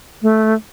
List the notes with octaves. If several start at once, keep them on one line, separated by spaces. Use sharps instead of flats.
A3